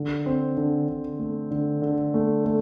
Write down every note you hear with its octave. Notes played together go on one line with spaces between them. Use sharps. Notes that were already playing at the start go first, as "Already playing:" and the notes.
Already playing: D3
C4
D3
D3
A3
D3
D3
A3
A3